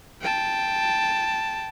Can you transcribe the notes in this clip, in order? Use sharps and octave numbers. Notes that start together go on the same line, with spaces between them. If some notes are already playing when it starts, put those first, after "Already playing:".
G5 A5